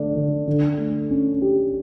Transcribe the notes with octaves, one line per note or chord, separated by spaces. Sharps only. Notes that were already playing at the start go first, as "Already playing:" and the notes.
Already playing: D3 A3 D4
D3
D3
A3
C#4
G4